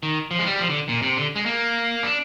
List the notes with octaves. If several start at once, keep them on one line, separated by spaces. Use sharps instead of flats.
D#3
F3
G#3
G3
F3
D3
A#2
C3
D3
G#3
A#3
D4